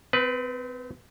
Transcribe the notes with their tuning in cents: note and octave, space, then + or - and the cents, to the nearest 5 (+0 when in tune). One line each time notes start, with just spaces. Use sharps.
C4 -35 B4 +0